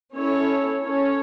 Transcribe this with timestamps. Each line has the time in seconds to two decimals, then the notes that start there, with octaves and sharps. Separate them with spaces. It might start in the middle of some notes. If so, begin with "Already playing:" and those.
0.15 C#4 E4 A4 C#5
0.80 C#4 A4 C#5